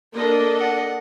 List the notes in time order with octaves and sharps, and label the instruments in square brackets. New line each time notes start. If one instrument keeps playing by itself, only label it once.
[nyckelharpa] A#3 [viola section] D4 A4 D#5
[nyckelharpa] F#5